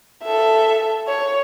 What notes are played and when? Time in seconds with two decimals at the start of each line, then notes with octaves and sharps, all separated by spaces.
0.23 A4 E5
1.07 C#5